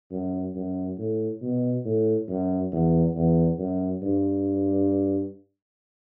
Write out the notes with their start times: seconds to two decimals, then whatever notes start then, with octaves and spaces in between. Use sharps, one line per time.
0.11 F#2
0.55 F#2
0.98 A2
1.42 B2
1.85 A2
2.28 F#2
2.72 E2
3.15 E2
3.58 F#2
4.02 G2